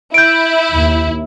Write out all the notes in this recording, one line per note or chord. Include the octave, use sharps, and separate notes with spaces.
E4 G6 D7
D#2